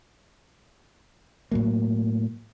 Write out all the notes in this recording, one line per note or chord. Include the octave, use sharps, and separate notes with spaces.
A2 F#3 A#3